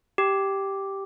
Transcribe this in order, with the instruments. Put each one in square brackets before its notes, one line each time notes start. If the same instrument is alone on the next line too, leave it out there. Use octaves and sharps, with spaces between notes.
[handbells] G4